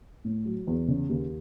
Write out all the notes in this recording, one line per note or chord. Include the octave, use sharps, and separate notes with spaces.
A2
F#3
E2
C#3
D#2